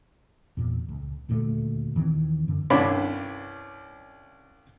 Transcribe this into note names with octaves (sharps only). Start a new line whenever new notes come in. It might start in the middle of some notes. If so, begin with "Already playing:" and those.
E2 A#2
C#2
D#1 D2 A#2 A3
D#2 D#3 E3 C4
F#2 D3
C2 G2 C#4 D4 B5 D6